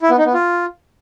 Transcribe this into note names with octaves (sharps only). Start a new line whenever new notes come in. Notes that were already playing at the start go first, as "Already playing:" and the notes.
E4
B3
D#4
B3
F4